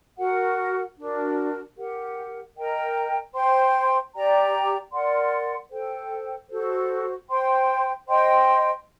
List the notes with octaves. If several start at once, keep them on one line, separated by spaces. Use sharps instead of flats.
F#4 A#4 F#5
D4 F#4 A#4
G4 A#4 F#5
A#4 D#5 G5 A#5
C5 G5 C6
G4 D5 G5 A#5
A#4 D5 F#5 C6
A4 C5 G5
F#4 A4 C5
C5 G5 C6
C5 D#5 G5 C6